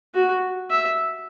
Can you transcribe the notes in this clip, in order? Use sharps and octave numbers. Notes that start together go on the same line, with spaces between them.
F#4
E5